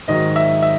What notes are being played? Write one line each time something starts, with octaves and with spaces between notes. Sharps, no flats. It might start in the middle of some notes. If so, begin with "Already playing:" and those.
G#2 D#3 F#3 D#5
E5
E5